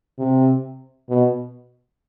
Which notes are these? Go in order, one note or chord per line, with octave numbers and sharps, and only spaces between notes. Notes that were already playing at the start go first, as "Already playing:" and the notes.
C3
B2